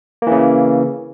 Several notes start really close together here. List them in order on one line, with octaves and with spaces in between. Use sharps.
A#3 E3 C#3